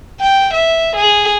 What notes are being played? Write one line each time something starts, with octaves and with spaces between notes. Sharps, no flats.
G5
E5
G#4